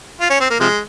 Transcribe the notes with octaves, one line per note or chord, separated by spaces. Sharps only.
F4
C#4
C4
A#3
C3 F3 G#3